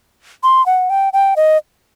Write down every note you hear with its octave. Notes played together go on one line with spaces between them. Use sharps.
C6
F#5
G5
G5
D#5